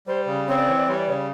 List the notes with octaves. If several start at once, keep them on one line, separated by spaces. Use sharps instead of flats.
G3 C5
C#3
C4 C#5
D5
E3 C#5
D5
G3 C#5
D5
C#3 C#5